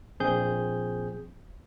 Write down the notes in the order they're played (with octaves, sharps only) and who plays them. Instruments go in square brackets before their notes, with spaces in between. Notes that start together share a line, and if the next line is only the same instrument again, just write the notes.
[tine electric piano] A#1 C4 G#4 G6